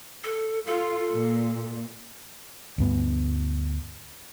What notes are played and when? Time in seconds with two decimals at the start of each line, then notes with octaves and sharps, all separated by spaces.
0.24 A4
0.67 F4 A4
1.14 A#2
2.78 D2 G2 B3